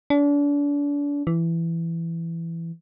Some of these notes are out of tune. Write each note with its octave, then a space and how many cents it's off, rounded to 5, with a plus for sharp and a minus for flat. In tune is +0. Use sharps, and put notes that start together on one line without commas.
D4 -35
E3 +15